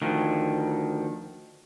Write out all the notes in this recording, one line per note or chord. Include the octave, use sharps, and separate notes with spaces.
D2 D#3 F3